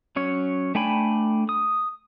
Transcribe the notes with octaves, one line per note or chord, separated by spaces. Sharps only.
F#3 C#4 C#5
A3 D4 G5 G#5 B5
D#6